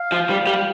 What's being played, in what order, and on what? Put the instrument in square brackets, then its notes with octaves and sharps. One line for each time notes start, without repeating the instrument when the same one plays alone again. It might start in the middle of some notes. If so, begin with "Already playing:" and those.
Already playing: [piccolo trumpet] F5
[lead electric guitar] F3
G3
G3